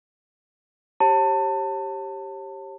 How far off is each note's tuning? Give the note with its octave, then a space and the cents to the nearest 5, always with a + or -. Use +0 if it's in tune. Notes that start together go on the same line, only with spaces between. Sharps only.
G4 +0 C#5 -40 A5 +25